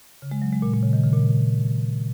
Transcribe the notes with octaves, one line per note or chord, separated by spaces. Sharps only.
C#3
G#3
F#3
G#3
A#2
A#2
C#3
D#3
C#3
A#2